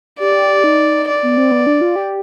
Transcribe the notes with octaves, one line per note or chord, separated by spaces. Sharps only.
G4 D5
D#4
D5
B3
C4
B3
D4
F4
G4